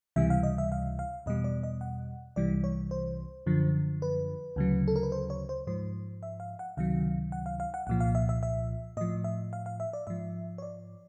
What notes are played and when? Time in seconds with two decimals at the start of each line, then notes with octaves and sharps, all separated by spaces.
0.16 C#2 C3 E3 G3 E5
0.30 F5
0.43 D#5
0.58 E5
0.72 F5
0.99 F5
1.26 E2 B2 G3 D#5
1.44 D5
1.63 D#5
1.81 F#5
2.36 C2 C3 E3 G3 D5
2.64 C#5
2.91 C5
3.46 F#2 D3 F3
4.02 B4
4.56 D2 C#3 F#3
4.88 A4
4.96 A#4
5.03 B4
5.12 C5
5.30 C#5
5.49 C5
5.67 G#2 F3 C5
6.23 E5
6.40 F5
6.59 F#5
6.77 C#2 C3 D#3 F#3 F5
7.32 F#5
7.46 F5
7.60 F5
7.74 F#5
7.87 C2 A#2 F3 F#5
8.00 F5
8.15 E5
8.29 E5
8.43 E5
8.97 A2 F3 D#5
9.24 E5
9.53 F5
9.66 F5
9.80 E5
9.93 D5
10.07 G#2 F3 E5
10.58 C#5
10.62 D5